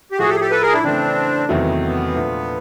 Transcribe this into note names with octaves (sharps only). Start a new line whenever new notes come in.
G4
A2 F3 A3 F#4 G#4
G4 A4
G#4
G4 A4
A4 B4
G#4 A#4
D4 E4
C#3 E3 A3 C4 D4
E2 C3 D#3 F#3 A3 C4
B3
B3
A#2 F3 A3 D4 F4